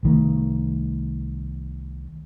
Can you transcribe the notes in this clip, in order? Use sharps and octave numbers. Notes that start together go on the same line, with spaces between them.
C2 D#3 A3